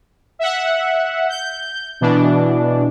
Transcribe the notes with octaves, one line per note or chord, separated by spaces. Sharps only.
E5 F#5
G6
B2 E3 D4